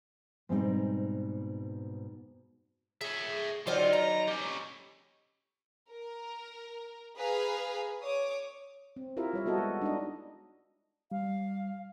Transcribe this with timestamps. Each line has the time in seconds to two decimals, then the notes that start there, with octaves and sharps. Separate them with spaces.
0.49 G#2 B2 G3 C4 D4 D#4
3.01 G#4 C#5 E5
3.67 D3 D#3 F#3 F4 F#4 G#4 C5
3.93 B4 A#5
4.28 C#4 G4
5.91 A#4
7.16 G#4 B4 F5 A#5
8.02 C#5 D6 D#6
8.96 C4
9.17 E4 F4 G4 A#4 E5
9.33 G3 C#5 E5
9.46 B3 E4 F#4 A4 D#5
9.58 G#3
9.81 D4 D#4 D#5
11.12 G3 F5